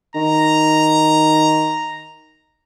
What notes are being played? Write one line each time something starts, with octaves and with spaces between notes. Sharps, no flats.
D#3 A#5